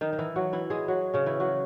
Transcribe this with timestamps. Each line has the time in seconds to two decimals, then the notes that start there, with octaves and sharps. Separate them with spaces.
0.01 D#3 D#4
0.13 D#4
0.18 E3 E4
0.36 F#3 F#4
0.53 E3 E4
0.70 G#3 G#4
0.88 F#3 F#4
1.14 C#3 C#4
1.26 E3 E4
1.40 F#3 F#4